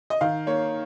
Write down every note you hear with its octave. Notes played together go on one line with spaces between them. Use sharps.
D#5
D#3 F5
A#3 C#5